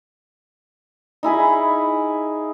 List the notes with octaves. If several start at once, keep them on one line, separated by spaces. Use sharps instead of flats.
D#4 E4 G#4 B5